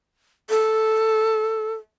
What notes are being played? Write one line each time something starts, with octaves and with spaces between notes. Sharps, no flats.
A4